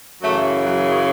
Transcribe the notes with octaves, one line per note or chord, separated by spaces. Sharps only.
F#2 C#3 E3 F#3 A3
F#3